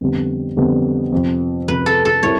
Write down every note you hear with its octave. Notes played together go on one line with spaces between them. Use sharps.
F2 D3 G3 B3
F2 D3 G3 B3
F2 C3 F3
F2 C3 F3 B4
A4
A4
G3 C4 E4 G4 A#4 C#5